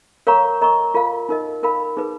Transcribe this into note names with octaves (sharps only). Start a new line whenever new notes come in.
A#4 C#5 F5 A#5 C#6
A#4 D#5 A#5 C#6
F4 A#4 F5
D#4 A#4 D#5
D#4 A#4 F5 B5
D#4 G#4 B4